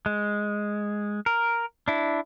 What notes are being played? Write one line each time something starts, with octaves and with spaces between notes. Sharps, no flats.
G#3
A#4
D4 E4